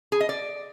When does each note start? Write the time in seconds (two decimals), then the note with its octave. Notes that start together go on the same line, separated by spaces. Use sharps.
0.12 G#4
0.20 D#5
0.29 D5